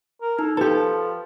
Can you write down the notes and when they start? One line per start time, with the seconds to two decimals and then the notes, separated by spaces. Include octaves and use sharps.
0.22 A#4
0.39 D#4 A4
0.57 F3 G4 A4 B4